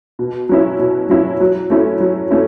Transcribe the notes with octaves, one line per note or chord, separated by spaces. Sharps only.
B2
F#3 C#4 E4
B2
F#3 C#4 E4
F#3
A3 C#4 E4
F#3
A3 C#4 E4